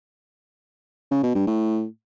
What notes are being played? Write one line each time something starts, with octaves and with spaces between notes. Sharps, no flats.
C#3
B2
G2
A2